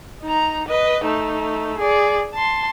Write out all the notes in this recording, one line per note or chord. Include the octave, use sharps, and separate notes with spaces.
D#4 A#5
B4 D#5
A3 D#4
G#4 D5
A5 C6